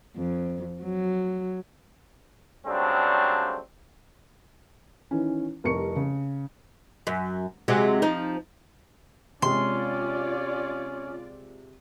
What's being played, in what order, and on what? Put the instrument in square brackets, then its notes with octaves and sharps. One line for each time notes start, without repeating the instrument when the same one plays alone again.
[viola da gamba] F2
F#3
[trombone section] C#3 F#3 G3 A3 C4 D4
[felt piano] D#3 E3 C#4
F1 C2 G3 A#4 C#6 C#7
C#3
[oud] F#2
C3 F#3 G#3
F3 D#4
[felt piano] C3 G#3 [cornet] C#4 [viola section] F4 D5 [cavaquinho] C6